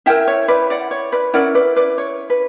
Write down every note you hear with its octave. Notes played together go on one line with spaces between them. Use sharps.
E4 A#4 E5 G5
C#5
B4 D5
D5 F#5
C#5
B4 D5
C#4 E4 A#4 D5 F#5
B4 D5
B4 D5
C#5
B4